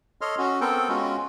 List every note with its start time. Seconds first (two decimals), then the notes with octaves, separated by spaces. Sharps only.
0.21 A4 C#5 D#5 C6 F6
0.38 C#4 F#4
0.61 B3 C4 A4 A#4 G5
0.89 G#3 C#4 F4 F#4